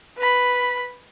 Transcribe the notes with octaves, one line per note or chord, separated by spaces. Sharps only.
B4 B5